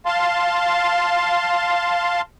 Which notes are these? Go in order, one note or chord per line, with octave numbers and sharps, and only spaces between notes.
F5 A5 C6